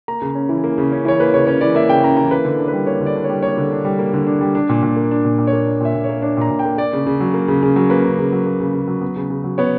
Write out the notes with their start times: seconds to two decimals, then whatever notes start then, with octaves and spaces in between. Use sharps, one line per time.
0.08 A#3 A#5
0.22 C#3
0.35 C#4
0.49 E3
0.64 A#3
0.78 C#3
0.92 C#4
1.05 E3 C#5
1.20 A#3 B4
1.34 C#3 C#5
1.47 C#4 C#5
1.61 E3 D5
1.75 A#3 E5
1.89 C#3 G5
2.04 C#4 A#5
2.17 E3 A#5
2.31 A#3 B4
2.45 D3
2.59 D4
2.68 G3 B4
2.87 A#3 C#5
3.00 D3
3.06 D5
3.15 D4
3.24 C#5
3.29 G3
3.43 A#3 C#5
3.58 D3
3.72 D4
3.85 G3
3.99 A#3
4.13 D3
4.26 D4
4.41 G3
4.55 D4
4.69 A#2
4.83 A#2
4.96 A#3
5.11 D4
5.25 A#2
5.39 A#2
5.47 C#5
5.53 A#3
5.66 D4
5.81 A#2 E5
5.95 A#2
6.04 C#5
6.09 A#3
6.22 D4 C#5
6.37 A#2 A#5
6.50 A#2
6.59 G5
6.65 A#3
6.78 A#3 D5
6.93 C#3
7.06 C#3
7.20 F#3
7.34 A#3
7.48 C#3
7.63 C#3
7.76 F#3
7.90 A#3 B4
8.04 C#3
8.19 C#3
8.32 F#3
8.46 A#3
8.60 C#3
8.74 C#3
8.88 F#3
9.02 B3
9.16 C#3
9.30 C#3
9.44 F#3
9.58 B3 C#5